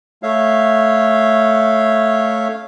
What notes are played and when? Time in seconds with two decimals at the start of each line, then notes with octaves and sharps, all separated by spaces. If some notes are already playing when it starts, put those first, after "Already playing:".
0.23 A3 C#5 E5 F5